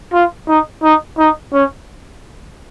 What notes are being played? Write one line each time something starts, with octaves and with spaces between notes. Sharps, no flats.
F4
D#4
D#4
D#4
C#4